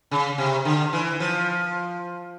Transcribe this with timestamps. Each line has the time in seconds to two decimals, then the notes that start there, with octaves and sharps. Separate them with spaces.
0.11 C#3
0.38 C3
0.65 D3
0.93 E3
1.20 F3